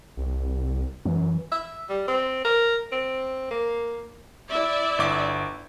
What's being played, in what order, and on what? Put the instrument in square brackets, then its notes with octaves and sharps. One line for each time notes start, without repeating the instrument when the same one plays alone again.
[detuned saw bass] C2
[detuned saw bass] F#2 [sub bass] E3
[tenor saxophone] E5
G3
C4
A#4
C4
A#3
[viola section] E4 D5 E5
[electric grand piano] G1 D6